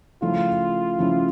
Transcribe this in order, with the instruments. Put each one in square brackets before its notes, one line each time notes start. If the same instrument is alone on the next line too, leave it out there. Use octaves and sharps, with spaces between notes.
[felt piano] C#3 F3 A3 C#4 E4 [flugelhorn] F4
[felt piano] C#3 F3 A3 C#4 E4